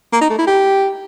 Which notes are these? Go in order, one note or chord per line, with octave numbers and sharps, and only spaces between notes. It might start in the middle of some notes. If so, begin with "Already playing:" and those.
A#3
D#4
A3
E4
G4